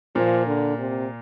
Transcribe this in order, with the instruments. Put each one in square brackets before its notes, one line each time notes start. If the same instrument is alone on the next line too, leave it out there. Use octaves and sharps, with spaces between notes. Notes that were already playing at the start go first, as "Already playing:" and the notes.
[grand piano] A#2 A#3 [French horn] F3
[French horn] D3
C3